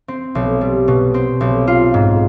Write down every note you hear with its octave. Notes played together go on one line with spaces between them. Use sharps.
C4
B1
G3
B2
C4
B1
F4
G#2